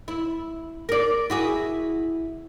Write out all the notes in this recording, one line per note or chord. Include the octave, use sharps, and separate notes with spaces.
E4
A#4 D5
E4 F#4 G#4